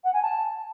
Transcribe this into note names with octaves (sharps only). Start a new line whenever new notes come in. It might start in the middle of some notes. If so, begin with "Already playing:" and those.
F#5
G#5
A5